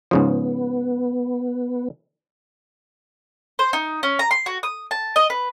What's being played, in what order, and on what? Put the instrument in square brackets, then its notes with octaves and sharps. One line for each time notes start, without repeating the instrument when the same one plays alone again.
[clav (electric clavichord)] G#2 C#3 F3 [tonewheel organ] B3
[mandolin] C5
D#4
C#4
A#5
C6
F#4
D#6
A5
D#5
B4